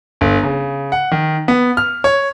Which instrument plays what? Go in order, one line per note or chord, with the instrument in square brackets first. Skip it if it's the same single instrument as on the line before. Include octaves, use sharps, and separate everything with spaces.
[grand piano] G1
C#3
F#5
D#3
B3
F6
C#5